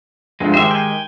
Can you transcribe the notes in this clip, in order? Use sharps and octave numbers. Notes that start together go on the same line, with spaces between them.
D2 G2 F3 G#3
D#3 G#3 G4 C5 E5
G5 G#5